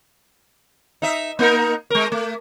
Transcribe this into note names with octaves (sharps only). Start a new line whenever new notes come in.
D#4 E5
A#3 D#4 A#4
G#3 A#4
A3